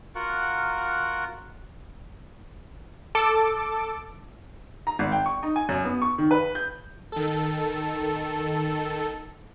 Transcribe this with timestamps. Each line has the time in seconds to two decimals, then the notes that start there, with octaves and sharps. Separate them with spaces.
0.15 F4 F#4 A#4 F#5
3.15 A4 D6
4.87 A#5
4.99 G#1
5.12 G5
5.26 C#6
5.43 D#4
5.56 G#5
5.69 F#2
5.84 B3
6.02 C#6
6.18 D#3
6.31 B4
6.55 G6
7.12 D#3 A4